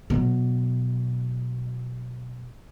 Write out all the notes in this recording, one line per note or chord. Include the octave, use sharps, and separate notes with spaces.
B2 F#3